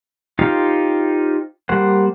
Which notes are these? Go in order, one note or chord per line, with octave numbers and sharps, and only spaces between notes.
D#4 F4 G4 C5 F5
G3 A#3 C5 F#5